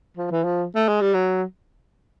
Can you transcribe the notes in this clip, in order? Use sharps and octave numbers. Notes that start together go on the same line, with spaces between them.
F3
E3
F3
A3
G#3
G3
F#3